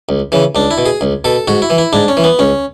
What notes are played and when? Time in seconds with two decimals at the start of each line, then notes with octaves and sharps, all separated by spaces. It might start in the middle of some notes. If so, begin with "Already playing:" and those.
0.09 C#2
0.32 C#3 E3
0.55 C#2 D4
0.71 E4
0.78 B2
0.86 G#4
1.01 C#2
1.24 B2 A4
1.48 G#2 F#4
1.62 E4
1.70 E3
1.78 E4
1.93 G#2 D4
2.08 C#4
2.17 E3
2.24 B3
2.39 C#2 C#4